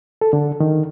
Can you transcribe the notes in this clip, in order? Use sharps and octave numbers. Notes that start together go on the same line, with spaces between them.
A4
D3
D#3